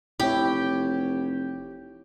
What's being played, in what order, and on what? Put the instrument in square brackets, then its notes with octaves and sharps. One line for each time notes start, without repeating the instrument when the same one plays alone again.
[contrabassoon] F1 [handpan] E4 C#5 [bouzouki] G4